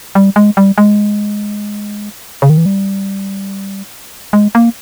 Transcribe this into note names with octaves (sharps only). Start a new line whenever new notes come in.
G3
G#3
G3
G#3
C#3
D#3
E3
G3
G#3
A#3